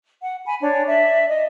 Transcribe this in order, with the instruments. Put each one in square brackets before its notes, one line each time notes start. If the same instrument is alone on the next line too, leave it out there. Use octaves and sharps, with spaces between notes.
[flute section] F#5
G#5 B5
D4 C#5
D5 E5
D#5